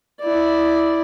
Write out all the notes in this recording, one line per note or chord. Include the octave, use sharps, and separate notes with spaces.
E4 D5